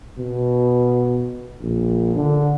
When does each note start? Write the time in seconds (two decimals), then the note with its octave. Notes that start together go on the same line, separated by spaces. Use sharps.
0.19 B2
1.61 A#1
2.15 D3